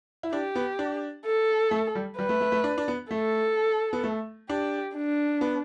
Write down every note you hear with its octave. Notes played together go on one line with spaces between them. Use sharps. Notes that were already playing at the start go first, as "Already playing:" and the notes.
E4
D4 G4
B3
D4
A4
A3
G3
G3 B4
A3
A3
A3
D4
D4
B3
A3 A4
B3
A3
D4 G4
D4
B3